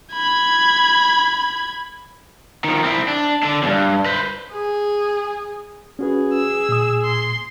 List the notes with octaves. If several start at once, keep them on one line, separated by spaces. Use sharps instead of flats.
B5 G#6
D#3 F3
C4 E4
D4
D3 D4
E2 G2
B4 C5
G#4
C#4 F#4 G#4 B4
E6
A#2 D#6
C6